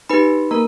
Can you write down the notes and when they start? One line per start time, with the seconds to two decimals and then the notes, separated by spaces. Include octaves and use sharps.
0.09 D#4 G4 B4 B5
0.51 A#3 A#4 A#5